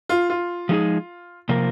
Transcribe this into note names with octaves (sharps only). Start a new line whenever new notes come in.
F4
F4
F3 G#3 D#4 G#4
C3 F3 A#3 F4 A#4